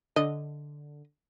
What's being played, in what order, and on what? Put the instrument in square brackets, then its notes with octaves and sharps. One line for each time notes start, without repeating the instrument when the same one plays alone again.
[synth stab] D3 [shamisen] D#5